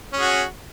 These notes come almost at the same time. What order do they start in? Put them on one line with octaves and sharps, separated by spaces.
C#4 G#4 F#4